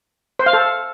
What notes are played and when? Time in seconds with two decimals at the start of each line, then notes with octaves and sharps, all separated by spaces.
0.39 C5
0.46 F5
0.53 A4